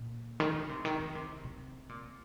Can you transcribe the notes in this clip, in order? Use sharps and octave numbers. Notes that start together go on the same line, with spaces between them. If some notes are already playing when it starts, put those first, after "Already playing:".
Already playing: A#2
D#3
D#3
C3
D#3
D#3
C3
C3
A#2